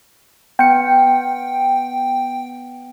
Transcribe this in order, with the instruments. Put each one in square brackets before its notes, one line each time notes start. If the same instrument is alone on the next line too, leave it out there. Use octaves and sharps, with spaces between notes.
[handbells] B3 C#7 [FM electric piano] G5